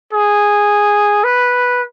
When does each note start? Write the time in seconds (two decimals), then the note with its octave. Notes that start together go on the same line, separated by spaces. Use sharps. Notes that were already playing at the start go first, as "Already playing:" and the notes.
0.13 G#4
1.24 B4